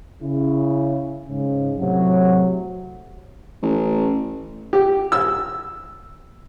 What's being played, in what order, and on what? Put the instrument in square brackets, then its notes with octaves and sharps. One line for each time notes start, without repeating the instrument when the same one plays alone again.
[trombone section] C#3 E4
G#2 C#3
A2 C3 F#3
[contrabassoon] A1
[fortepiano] G4
E6